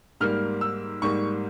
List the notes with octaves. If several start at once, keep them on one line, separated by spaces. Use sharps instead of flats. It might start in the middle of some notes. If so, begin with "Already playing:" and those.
G#2 G3 A#3 F6
E6
G#2 G3 A#3 C#6